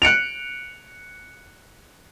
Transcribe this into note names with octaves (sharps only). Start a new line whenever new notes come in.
F#6 C#7 D7 F7